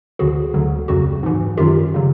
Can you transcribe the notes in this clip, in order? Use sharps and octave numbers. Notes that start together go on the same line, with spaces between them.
D2 D3 F#3 F#4 G#4
D2 D3 F#3
F2 C#3 F#3 F#4
G#2 E3
F#2 D#3 F#3 F4 G4
C#3 F#3